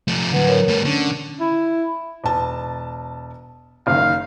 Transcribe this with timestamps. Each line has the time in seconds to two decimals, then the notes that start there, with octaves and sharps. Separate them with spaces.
0.08 F3 A3
0.32 D3 F#3 B4 F#5
0.47 A#4 C#5
0.68 G3 A3
0.85 D3 C#4
1.40 E4
2.24 E1 A5
3.87 F#1 D#3 F5